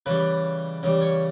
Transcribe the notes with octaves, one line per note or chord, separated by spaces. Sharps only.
C#3 E3 G3 B4
C#3 E3 G3
C#5